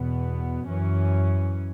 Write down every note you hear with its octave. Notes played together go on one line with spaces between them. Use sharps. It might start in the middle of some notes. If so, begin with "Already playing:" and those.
Already playing: E2 B2 B3
F#2 E3 C#4